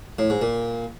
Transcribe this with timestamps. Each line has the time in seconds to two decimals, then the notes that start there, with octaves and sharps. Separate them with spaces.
0.19 A2
0.30 G#2
0.42 A#2